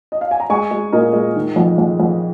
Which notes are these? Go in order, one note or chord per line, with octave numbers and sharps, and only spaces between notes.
D#5
F5
G#5
A#5
G#3 G#5 C#6
G#3
A#2 A#4 D#5
G#3
D#3
F2
F2
F2